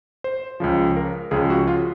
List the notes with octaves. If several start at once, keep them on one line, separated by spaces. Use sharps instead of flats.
C5
C#2 C#3 F3
A#4
C#2 C#3 F3 G#4
F#4
F4